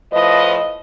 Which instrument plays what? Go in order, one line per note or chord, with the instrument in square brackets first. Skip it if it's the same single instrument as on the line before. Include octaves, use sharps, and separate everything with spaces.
[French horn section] A2 F3 B4 D#5